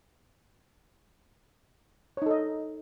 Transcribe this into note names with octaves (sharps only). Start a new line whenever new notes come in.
D#4 A4 C#5 D#5